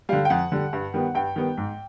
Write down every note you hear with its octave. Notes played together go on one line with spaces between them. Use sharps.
D3 G3 F5
G5
F2 F#5
D3 G3
G2
D#3 G3 B3
G2 G5
D#3 G3 B3
G#2